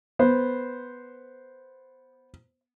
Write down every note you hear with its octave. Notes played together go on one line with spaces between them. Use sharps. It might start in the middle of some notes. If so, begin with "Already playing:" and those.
B3 C5